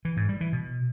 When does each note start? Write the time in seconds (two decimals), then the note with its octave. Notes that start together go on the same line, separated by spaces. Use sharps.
0.05 E3
0.17 G#2
0.29 G3
0.41 E3
0.53 B2